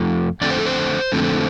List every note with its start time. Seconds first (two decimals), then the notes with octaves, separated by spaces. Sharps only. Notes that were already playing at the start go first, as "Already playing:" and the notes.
Already playing: F2 F3 A3
0.41 F2 D3 A3 C4 D5
0.50 C5
0.59 A4
0.66 C5
1.12 F2 D3 A3 C4